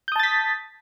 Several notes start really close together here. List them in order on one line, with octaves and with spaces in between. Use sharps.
G6 D#6 A5 A6 B6